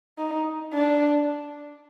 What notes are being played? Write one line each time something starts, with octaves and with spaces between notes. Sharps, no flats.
D#4
D4